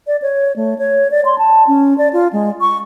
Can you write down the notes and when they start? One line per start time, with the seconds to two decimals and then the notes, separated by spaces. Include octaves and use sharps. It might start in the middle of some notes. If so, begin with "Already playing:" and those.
0.07 D5
0.22 C#5
0.56 A3
0.78 C#5
1.11 D5
1.25 C6
1.38 A5
1.67 C#4
1.98 D5
2.13 F4
2.33 G#3
2.61 C#6